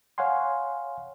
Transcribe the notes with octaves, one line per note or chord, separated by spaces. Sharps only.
C#5 F5 F#5 G#5 C6